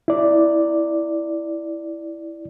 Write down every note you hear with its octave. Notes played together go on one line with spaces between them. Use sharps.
E4 D5